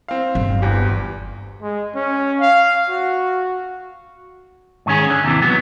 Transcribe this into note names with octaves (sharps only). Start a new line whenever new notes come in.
C4 F5
G1
D1 E2 G4
G#3
C#4
F5
F#4
G#2 D#3 C#4 G#4
D3
D#2 C3 E3
F#3 B3